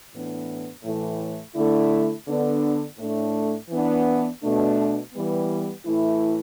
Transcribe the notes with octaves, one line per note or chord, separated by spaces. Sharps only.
A2 E3 B3 D4
A2 E3 A3
D3 A3 E4
D3 B3 D4
A2 A3 D4
E3 B3 D4
B2 A3 D4
E3 G3 B3
A2 E3 A3 E4